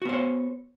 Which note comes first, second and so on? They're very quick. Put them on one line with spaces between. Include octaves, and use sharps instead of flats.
F#4 B3 C5 C#5